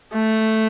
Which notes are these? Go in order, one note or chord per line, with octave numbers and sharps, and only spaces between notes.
A3